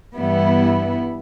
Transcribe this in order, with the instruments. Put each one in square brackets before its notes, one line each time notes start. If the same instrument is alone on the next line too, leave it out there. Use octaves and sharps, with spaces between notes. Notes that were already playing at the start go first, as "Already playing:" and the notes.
[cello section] G2 E3 G3 B3 E4